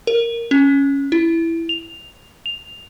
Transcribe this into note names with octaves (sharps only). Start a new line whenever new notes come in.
A#4
C#4
E4
F7
F7